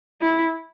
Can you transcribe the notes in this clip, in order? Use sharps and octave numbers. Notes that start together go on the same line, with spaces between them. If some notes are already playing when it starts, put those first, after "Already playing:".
E4